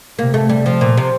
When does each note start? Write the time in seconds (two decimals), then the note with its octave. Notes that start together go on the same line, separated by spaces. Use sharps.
0.19 C3 A#3
0.34 A3
0.49 G3
0.66 F3
0.81 A#2
0.97 C3